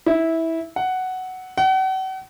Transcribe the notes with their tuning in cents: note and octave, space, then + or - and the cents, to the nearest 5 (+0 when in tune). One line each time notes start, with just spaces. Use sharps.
E4 -15
F#5 +5
F#5 +40